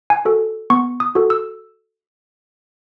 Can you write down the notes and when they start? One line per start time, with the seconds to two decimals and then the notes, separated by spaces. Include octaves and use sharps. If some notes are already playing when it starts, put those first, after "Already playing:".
0.10 G#5
0.25 F#4 A4
0.70 B3 C#6
1.00 D#6
1.15 F#4 A4
1.30 E6